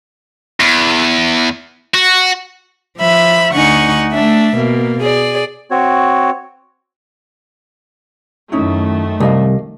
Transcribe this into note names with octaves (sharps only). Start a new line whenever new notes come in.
E2
F#4
F3 E5 B5
D2 D3 D#4 F#5 G#5 C#6
A3 D4 E5
B2 A#3
G#4 D5
C4 F#4 C#5
F#2 D#3 A3 C#4 D#4 E4
C2 G4 D#5 F5